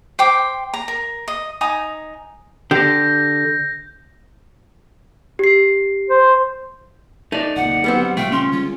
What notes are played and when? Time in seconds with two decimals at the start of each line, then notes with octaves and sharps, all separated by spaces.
0.19 C5 G5 D6
0.74 A#5
0.88 A#4
1.28 D#5
1.61 D#4 G#5 A#5 D#6
2.71 D3 G4 G6 A#6
5.39 G4 C7
6.10 C5
7.32 A3 D#4 D5
7.56 F1 C#2 A#2 F#5
7.84 D3 F#3 G3 B3 C4
8.17 A#2 C#3 F3 G3 A3 G5
8.32 C#4 C6
8.52 D3 G3 G#3 F4